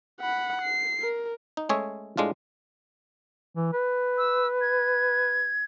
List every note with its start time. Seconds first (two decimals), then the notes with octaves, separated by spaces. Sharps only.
0.21 F#5 B5
0.62 C7
1.02 A#4
1.57 D#4
1.69 G#3 A3 C#4 G#4 C#5 E5
2.17 A2 G#3 D4 F4
3.55 E3
3.73 B4
4.18 E6
4.61 G#6